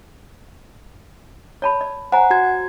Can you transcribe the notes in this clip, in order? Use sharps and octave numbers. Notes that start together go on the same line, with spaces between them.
C#5 A5 B5
D5
C5 F#5 G#5 A#5
F#4 G#6